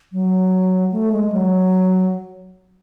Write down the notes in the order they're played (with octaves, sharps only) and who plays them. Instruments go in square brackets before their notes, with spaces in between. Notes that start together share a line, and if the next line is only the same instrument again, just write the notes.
[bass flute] F#3
A3
G#3
F#3